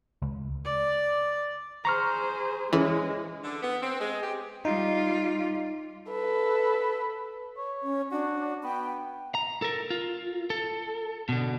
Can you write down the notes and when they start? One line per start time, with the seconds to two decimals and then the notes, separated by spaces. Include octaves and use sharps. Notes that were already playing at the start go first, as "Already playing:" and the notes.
0.22 C#2
0.65 D5
1.85 G#4 C5 A#5 C#6 F6
2.73 E3 G#3 C#4 G#4
3.43 D3
3.63 B3
3.82 C4
4.00 G#3
4.22 G4
4.65 G3 D#4 F4
6.11 A4 B4
7.57 C#5
7.83 C#4
8.11 D4 F#4
8.64 B3 G5
9.35 A#5
9.62 A4 A#4
9.90 F4
10.50 A4
11.29 B2 D3